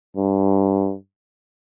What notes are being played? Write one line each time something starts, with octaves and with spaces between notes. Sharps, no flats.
G2